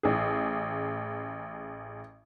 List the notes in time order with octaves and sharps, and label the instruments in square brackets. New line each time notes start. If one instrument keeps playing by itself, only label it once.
[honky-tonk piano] A1 G#4